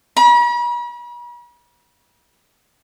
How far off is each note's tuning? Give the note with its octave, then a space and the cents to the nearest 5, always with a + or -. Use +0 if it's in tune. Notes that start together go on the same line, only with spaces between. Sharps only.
B5 -45